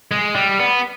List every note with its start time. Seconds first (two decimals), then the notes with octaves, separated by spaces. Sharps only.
0.11 G#3
0.35 G3
0.60 B3